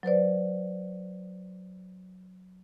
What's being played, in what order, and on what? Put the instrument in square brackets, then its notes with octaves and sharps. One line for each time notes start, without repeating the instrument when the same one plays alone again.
[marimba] F#3 B4 C5 D5